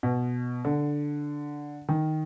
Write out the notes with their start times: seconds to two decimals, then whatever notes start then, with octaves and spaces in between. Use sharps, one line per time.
0.03 B2
0.65 D3
1.89 D#3